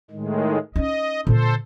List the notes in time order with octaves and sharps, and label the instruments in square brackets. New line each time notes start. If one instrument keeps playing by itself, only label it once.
[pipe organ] A2 D#3 G#3
[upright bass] C#4 D#4 [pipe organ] D#5
[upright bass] A#2 D3 [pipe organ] A4 C5